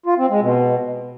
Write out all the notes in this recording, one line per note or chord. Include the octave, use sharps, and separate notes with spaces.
F4
C4
G#3
B2